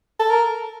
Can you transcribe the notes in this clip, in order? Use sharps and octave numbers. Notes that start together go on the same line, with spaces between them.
A4
A#4